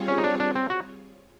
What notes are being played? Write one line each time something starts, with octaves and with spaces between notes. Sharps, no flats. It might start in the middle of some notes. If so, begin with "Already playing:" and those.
Already playing: G3 C4 F4 G#4 C#5
C#4
D#4
D4
D4
C4
F#4